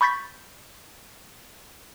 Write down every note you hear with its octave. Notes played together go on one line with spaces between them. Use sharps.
B5 C#6 G6 A6 B6